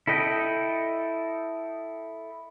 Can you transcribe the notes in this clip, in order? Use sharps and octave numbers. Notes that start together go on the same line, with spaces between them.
E4 A4 D#5 G5